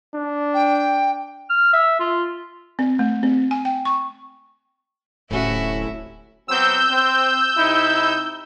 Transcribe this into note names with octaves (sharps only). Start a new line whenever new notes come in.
D4
G5
F6
E5
F4
C4
A3
C4
G#5
G5
C#6
D1 A2 C3 C#4 E4 F#4 E5
F#3 B3 C4 E6 G6
C4
C3 D#4 E4